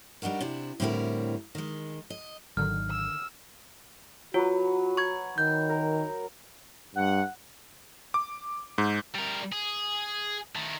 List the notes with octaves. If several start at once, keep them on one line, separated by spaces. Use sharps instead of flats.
G3 D4 D#4 F#4 A#4
C3 D4 E4
A2 D3 G3 C4 E4 A#4
D#3 G#3
D#5
G#1 D3 D#3 F#3 F6
E6
F#3 F4 F#4 B4
C#6 G#6
D#3 G6
A#4
G2 F#5
D6
G#2
G3 A#4
G#4
D#3 A3